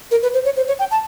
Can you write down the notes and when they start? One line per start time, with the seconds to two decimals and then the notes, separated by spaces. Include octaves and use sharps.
0.11 A#4
0.23 B4
0.33 C5
0.44 C#5
0.56 C5
0.67 C#5
0.79 G5
0.91 A5